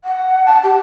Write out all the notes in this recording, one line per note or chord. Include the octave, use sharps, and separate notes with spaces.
F#5
A5
G4